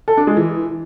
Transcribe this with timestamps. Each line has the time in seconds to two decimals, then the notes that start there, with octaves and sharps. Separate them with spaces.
0.08 A4
0.17 D4
0.27 G#3
0.37 E3